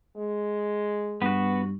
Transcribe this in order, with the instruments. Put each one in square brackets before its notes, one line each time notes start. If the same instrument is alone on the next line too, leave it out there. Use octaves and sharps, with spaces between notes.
[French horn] G#3
[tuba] G2 [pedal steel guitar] B3 F#4